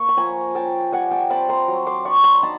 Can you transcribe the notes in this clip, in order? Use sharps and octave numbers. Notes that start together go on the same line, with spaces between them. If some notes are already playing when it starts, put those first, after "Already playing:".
Already playing: A#3 C#6
B5
F3 G#5 A#5
C#4 G5 A5
G3 F#5 G#5
G5 A5
C4 A5 B5
A#5 C6
F#3
C6 D6
D4 B5 C#6
A#5 C6
D#4 A5 B5